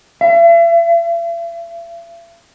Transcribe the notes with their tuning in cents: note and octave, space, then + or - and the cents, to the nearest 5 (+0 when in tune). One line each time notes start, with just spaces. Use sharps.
E5 +45